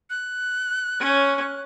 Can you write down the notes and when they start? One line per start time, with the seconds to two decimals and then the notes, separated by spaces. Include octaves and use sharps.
0.10 F#6
0.99 C#4 C#5